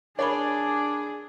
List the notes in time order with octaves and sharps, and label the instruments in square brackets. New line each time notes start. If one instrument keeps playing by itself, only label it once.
[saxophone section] D4 [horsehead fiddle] G#4 [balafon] A#4 B5 [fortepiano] C#5 D5